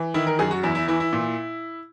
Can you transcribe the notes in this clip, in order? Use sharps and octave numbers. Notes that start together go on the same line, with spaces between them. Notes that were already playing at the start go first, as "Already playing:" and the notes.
Already playing: E3
D#3 E4
A#4
F#2 G#4
F#4
E2 E4
E4
E3 E4
E4
A#2